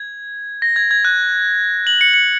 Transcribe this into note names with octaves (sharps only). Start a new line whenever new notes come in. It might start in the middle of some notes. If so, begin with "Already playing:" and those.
Already playing: G#6
A#6
G#6
G#6
F#6
F#7
C#7
C#7